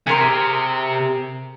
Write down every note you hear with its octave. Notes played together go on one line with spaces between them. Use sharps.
C3 G#4 A#4 C6